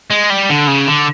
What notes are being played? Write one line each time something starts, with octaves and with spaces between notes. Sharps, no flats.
G#3
G3
D3
C#3
D3